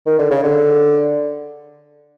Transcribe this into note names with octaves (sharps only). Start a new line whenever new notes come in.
D#3
D3
C#3
D3